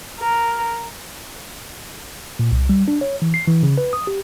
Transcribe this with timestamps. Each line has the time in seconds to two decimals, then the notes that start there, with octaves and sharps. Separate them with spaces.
0.19 A#4
2.39 A#2
2.52 C2
2.69 G3
2.88 D4
3.01 C#5
3.22 E3
3.34 C7
3.47 E3
3.63 C#3
3.78 B4
3.93 D#6
4.07 G4